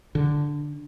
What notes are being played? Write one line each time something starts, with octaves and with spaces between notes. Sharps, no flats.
D3